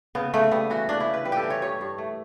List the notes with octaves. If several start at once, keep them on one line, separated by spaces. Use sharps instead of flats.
C#3 B3
C#3 A3
G3 B3
E3 F#4
C#3 D4
E4
C#3
B4
G3 B4
G4 A4
E3
C#5
G2 C#5
G2
A3